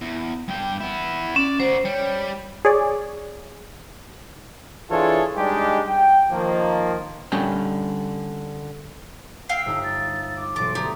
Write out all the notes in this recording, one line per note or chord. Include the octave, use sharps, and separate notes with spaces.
E2
G2 G5
B3 E4
C#4 D5
F#4 C5 D5
G3 C#5
G#4 C#5 D5
E3 D4 F4 G#4 A4 C#5
G3 G#3 D4 D#4 G4
G5
D#3 F3 A#3
D3 G3 C#4 G5
E5 F5 G5 C7
G1 G2 D#4 E6
A6
D6
E1 B1 C6 D6 A6
D2 G4 A#5 D#6